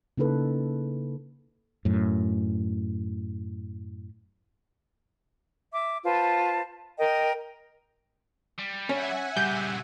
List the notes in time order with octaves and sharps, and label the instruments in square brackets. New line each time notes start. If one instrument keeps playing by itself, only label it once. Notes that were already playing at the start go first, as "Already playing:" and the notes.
[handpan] C#3 A#3 D#4 E4 A4 B4
[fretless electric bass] F#2 A2
[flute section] E5 D6
F4 B4 C5 A5
A#4 D#5 G5
[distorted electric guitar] G3
[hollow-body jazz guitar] C#4 [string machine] E5 F#5 G#5
[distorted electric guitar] A#2 C#3 [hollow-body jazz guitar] G3 [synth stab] G6